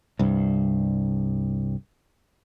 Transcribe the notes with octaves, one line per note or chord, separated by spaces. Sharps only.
C2 G2